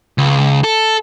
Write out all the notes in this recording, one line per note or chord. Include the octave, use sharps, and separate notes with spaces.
C#2
A4